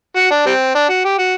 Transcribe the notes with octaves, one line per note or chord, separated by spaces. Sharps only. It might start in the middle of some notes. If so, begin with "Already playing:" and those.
F#4
D4
G3 C4
D4
F#4
G4
F#4